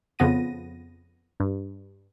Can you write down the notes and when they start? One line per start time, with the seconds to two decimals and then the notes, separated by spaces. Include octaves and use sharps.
0.19 F2 C#3 F3 B3 A#6 D#7
1.40 G2